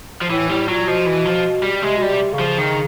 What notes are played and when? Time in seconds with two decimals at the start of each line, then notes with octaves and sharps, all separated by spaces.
0.21 F3
0.30 A2 E3
0.49 A2 G3
0.68 A#2 F#3
0.87 B2 F3
1.06 E3
1.25 F3
1.63 G3
1.82 C3 G#3
1.97 B2 G3
2.08 C3
2.34 C#3
2.39 F3
2.58 D#3